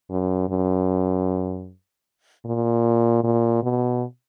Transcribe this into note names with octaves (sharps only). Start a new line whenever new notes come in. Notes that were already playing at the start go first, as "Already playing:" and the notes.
F#2
F#2
A#2
A#2
B2